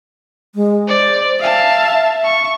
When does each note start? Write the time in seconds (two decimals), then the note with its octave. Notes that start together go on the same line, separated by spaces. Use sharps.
0.55 G#3
0.88 C5 D5
1.40 E5 F5 A5
2.24 C#6